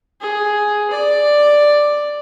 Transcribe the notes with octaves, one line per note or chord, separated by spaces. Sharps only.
G#4
D5